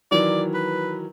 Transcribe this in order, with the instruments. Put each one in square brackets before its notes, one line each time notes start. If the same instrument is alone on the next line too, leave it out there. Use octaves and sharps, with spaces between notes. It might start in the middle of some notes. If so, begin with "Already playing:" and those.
[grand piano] D#3 E3 F#3 [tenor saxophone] D5
[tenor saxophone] B4